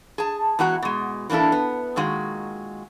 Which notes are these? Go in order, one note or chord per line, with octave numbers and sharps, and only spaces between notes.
G#4 A5
E2 G#3 F#4 F#5 A#5
B2 G#3
E3 A#3 D4 E4 A4
B3
A#2 D#3 G#3 F#4